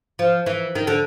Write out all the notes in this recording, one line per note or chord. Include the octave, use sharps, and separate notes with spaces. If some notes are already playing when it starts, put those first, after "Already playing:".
F3
E3
D#3
D3